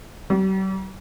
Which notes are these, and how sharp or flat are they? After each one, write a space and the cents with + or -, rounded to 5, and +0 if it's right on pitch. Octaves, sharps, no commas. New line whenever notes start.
G3 -45